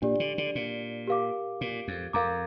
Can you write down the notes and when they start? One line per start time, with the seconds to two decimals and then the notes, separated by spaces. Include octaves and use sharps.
0.02 A#2 D4 G4 D5
0.20 D3
0.38 D3
0.55 A#2
1.07 G4 A#4 F5 D6
1.61 A#2
1.88 F2
2.13 F2 A#4 F5 A#5 D6